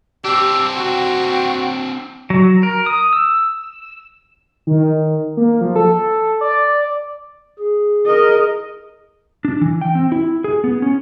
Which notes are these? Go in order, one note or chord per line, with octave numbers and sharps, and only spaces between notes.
C4 D4 G4 E6
F#4 G5
F#3
A#4
D#6
E6
D#3
A#3
F3
A4
D5
G#4
A#4 D#5
D4
E3
G5
C4
E4
G#4
B3
C#4